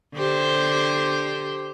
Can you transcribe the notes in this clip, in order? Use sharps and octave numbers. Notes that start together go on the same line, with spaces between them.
D3 G4 C5